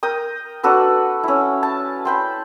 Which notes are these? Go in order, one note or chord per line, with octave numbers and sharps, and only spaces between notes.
A#4 G5 D#6
D4 F#4 A4 B4
C#4 E4
A5
C5 G5 B5